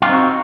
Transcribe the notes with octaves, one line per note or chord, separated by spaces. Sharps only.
C4 D#4 F4 F#4